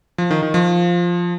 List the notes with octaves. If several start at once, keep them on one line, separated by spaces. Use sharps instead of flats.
F3
D#3
D#3
F3